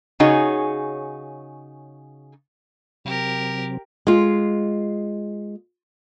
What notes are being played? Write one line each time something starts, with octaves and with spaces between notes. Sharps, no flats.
C#3 D#4 F#4 G#4 C#5
C3 F#3 C4 G4 A#4
G#3 F4